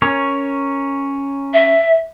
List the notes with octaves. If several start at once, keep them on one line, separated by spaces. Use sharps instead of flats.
C#4 A#4 C#5
E5